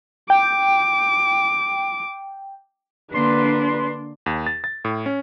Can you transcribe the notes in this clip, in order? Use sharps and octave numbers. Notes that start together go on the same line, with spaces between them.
G5 D6
D3 A#3 D4 B4 C6
D#2
A6
A6
A2
C#4